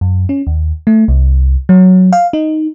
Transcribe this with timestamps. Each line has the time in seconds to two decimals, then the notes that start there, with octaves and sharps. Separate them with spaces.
0.01 F#2
0.29 C#4
0.47 D#2
0.87 A3
1.08 C2
1.69 F#3
2.13 F5
2.33 D#4